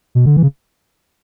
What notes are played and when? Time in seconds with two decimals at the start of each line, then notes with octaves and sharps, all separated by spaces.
0.15 B2
0.26 D3
0.37 E3
0.43 C#3